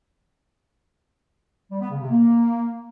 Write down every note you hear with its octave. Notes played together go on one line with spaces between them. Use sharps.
G3
B3
C#3
C3
A#3